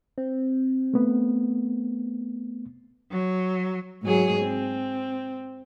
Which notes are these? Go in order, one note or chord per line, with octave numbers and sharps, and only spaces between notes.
C4
A3 B3
F#3
G#2 F#3 G#4
C4